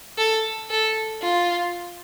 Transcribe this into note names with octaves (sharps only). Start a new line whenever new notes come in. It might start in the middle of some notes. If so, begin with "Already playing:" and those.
A4
A4
F4